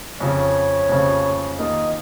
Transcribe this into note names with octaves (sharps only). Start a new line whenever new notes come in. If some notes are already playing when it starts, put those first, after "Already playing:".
F2 C#3 F3 C#5
F2 C#3 F3
D#3 A#3 F4 D#5